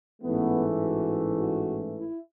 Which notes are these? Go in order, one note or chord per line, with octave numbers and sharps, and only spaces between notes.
A1 G#2 E3 A3 B3
F#4
F#4
E4